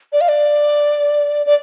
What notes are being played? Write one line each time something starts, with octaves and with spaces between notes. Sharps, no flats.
D5
F5
D5
D5